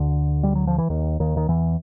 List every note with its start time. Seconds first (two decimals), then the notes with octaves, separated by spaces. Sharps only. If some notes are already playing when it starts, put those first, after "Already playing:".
Already playing: D2 D3
0.43 G3
0.55 F#3
0.67 F3
0.78 E3
0.90 D#2 D#3
1.20 D#2 D#3
1.37 D#3
1.48 E2 E3